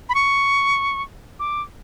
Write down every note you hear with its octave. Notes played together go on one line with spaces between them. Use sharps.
B5
C#6
D6